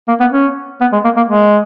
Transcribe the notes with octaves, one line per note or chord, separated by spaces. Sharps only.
A#3
B3
C#4
B3
G#3
A#3
A#3
G#3